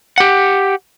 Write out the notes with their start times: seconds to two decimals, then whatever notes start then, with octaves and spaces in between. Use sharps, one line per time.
0.18 G4 F#5